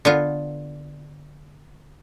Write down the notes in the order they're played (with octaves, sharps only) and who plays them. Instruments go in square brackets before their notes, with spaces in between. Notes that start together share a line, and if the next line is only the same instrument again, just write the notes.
[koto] D3 B3 F4